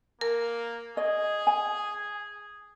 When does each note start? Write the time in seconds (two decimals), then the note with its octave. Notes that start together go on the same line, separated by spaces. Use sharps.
0.21 A#3 A#4
0.97 G#4 D#5
1.47 G#5